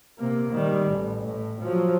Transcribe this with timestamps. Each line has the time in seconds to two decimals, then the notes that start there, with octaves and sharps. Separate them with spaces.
0.19 C3 A#3
0.53 D#3 G3
0.87 A1
1.24 A2
1.62 F3 F#3